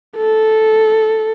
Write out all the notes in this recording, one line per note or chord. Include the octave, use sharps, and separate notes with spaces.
A4